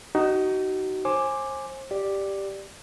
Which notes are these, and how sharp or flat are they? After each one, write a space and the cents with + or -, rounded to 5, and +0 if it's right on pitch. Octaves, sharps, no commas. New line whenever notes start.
D#4 +0 F#4 +35
C5 +35 G#5 +0 D6 +5
G4 +0 D5 +0